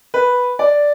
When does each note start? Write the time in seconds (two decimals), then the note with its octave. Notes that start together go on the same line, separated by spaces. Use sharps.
0.14 B4
0.59 D5